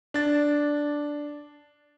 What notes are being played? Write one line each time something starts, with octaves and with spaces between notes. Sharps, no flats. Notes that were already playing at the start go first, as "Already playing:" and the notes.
D4 A6